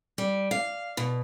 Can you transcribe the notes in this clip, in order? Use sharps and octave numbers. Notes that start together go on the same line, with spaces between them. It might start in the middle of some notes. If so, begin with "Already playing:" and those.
G3
F5
B2